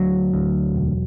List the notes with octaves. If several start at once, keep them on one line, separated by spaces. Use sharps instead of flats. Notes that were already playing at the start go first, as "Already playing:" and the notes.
Already playing: D2 F#3
D2
E1